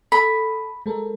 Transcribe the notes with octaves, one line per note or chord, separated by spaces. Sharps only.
A4 B5 D#6
G#3 A4 A#4